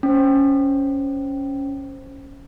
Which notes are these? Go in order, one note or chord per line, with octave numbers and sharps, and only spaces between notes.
C#4 C5